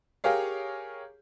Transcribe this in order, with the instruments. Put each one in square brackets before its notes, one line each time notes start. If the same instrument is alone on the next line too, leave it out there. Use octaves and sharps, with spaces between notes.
[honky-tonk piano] G4 G#4 A#4 C#5 F5